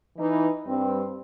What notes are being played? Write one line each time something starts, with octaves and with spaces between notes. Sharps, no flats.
E3 D#4
G2 C4